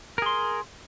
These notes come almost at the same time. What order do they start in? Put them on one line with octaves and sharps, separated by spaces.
A#4 G#4 C6